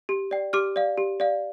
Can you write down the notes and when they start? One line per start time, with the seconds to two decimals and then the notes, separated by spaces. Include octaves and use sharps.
0.09 G4
0.31 D5 G5
0.53 G4 D6 F6
0.76 D5 F5
0.98 G4
1.20 D5 F5